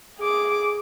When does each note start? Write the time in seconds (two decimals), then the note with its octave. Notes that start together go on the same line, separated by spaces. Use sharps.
0.18 G#4 D6